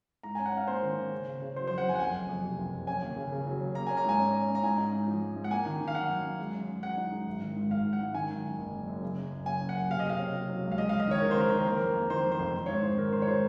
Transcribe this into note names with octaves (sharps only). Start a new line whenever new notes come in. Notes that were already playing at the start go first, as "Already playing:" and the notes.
G#2 A#5
C#4 G#5
F#5
C#4 F5
A#3 C5
D#3
C#4
C#3
C#3
C#3
F#3 C5
F2 C5
F#5
F2 G#5
F#5
F#1 G#5
F#1
F2
C3
F#1
F#1
C#4 G#5
D#2
C#3
C#3
F#3
F#3
A#3 A#5
C#4 G#5
A#5
G#2 G#5
C#4
C#4
C#4
A#5
G#2 G#5
D#4
G#2
F3
G#2
G#2
F#5
A#3 G#5
D#3
D#3
F5
F#2 F#5
F#2
F#2
G#3
F#2
F#2
F#2 F#5
D#4
G#3
G#1
D#3
G#2
G#1 F5
G#2
F#5
G#2
D#3 G#5
F#2
D#3
F#1
F#2
F#2
C#3
F#2
F#1
C#3 G#5
F#1
F#5
F#1
C3 F5
D#5
C3 F5
C#4
C3
F#3
C#2
F5
G#3 D#5
F2 F5
D#5
D#3 C#5
G#3 A#4
C5
D#3 A#4
D#3 C5
A#4
A#3 C5
F2 A#4
A#3
D#3 C5
F2
C5
F1
D#3
G#2 C#5
C5
G#2
D#3 A#4
D#3 C5
C#5
G#3 C5